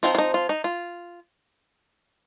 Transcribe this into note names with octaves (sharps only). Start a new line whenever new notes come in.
F3 C4 D#4 F4
F4
D#4
F4
D#4
F4